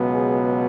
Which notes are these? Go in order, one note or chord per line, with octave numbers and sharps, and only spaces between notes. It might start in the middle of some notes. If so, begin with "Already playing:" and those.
Already playing: C#2 B2 F#3 B3
G#4